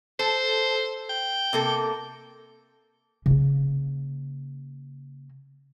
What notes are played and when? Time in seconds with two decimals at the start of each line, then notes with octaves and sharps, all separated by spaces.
0.19 A4 C5
1.09 G5
1.53 C3 A#3 A4
3.26 C#3 A#3